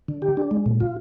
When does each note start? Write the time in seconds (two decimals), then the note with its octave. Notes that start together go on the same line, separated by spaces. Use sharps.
0.08 D3
0.22 G4
0.37 D4
0.51 G#3
0.66 A#2
0.80 F4